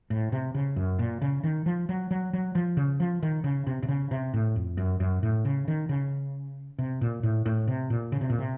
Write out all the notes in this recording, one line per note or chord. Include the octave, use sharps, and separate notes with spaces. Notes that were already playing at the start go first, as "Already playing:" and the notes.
A2
C3
C#3
F#2
A#2
C#3
D#3
F3
F#3
F#3
F#3
F3
C#3
F3
D#3
C#3
C3
C3
C#3
C3
A2
F2
F#2
F#2
A2
C#3
D#3
C#3
C3
A#2
A2
A2
C3
A#2
C#3
C3
A#2
C3